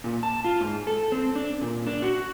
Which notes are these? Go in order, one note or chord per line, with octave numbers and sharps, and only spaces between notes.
A#2
A5
F4
G#2
A4
C4
D4
A#2
D4
F#4